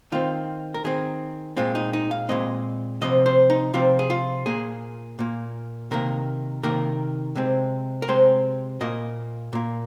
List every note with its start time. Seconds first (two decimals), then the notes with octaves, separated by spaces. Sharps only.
0.12 D#3 C4 F4
0.74 A#4
0.84 D#3 C4 G#4
1.57 A#2 G#3 C4 F4
1.75 D#4
1.93 D#4
2.11 F5
2.29 A#2 G#3 C4 D#5
3.01 C3 F3 C4 D#5
3.26 C5
3.50 D#4
3.74 C3 F3 C4 F4
3.99 G#4
4.10 F4
4.46 A#2 A#3 G#4
5.19 A#2 A#3
5.91 C3 D#3 A#3 A#4
6.63 C3 D#3 A#3 A#4
7.36 C3 G#3 C4
8.02 A#4
8.08 C3 G#3 C4 C5
8.81 A#2 A#3 D#5
9.53 A#2 A#3